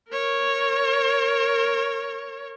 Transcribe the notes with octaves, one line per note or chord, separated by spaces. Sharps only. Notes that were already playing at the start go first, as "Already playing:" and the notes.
A#4 C#5